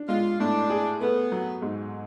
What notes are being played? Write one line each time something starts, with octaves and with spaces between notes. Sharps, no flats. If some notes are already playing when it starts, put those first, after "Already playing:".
Already playing: D4
G#3 F4
A2 D4
G#4
A3 B3
F#3
G#2